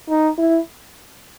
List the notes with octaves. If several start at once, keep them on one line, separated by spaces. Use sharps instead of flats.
D#4
E4